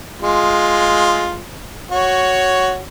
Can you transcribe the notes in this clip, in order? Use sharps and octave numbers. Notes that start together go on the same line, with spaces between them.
G#3 F4
F#4 C#5